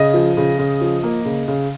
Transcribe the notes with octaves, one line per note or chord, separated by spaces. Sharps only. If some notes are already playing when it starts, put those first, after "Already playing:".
Already playing: C#3 D#5
F3
C#3
C#3
F3
A#3
C#3
C#3